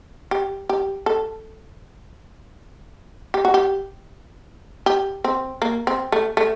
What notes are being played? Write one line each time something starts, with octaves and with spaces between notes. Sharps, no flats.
G4
G4
A4
G4
F#4
G4
G4
C4
A#3
C4
A3
A3